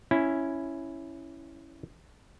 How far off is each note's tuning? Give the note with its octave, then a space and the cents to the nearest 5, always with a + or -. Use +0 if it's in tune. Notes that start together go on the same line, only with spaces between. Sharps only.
C#4 +0 E4 +0